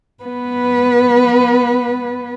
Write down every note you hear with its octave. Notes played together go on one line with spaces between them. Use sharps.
B3 B4